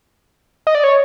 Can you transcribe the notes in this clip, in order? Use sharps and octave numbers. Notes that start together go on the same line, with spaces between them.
D#5
D5
C#5